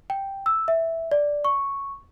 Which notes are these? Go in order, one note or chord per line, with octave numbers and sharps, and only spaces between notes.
G5
E6
E5
D5
C#6